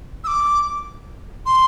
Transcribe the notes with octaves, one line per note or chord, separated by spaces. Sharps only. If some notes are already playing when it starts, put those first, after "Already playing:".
E6
D6
C6